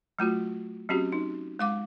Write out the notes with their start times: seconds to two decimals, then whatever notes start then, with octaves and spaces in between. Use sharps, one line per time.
0.19 F#3 A3 F4 F#4
0.89 F#3 C4 C#4 F#4 G4
1.12 D#4
1.59 G#3 F5 D6